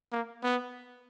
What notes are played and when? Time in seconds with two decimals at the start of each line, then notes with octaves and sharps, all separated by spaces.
0.12 A#3
0.43 B3